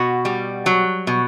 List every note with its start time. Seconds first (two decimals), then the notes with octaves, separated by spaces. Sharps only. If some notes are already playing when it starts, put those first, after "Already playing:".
Already playing: B2 F#4
0.25 G3
0.66 F#3
1.07 B2